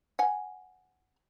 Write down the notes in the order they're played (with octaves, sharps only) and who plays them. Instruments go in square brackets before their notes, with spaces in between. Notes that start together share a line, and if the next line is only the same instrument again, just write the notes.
[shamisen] F#5 G#5